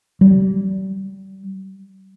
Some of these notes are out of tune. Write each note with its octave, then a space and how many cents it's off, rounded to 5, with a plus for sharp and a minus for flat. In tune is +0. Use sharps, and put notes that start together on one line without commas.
G3 -30